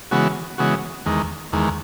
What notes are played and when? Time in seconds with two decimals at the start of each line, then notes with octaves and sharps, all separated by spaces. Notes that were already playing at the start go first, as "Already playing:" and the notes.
0.11 C#3 E3 G#3 B3 F#4
0.58 C#3 E3 G#3 B3 F#4
1.06 E2 D#3 G#3
1.52 E2 D#3 G#3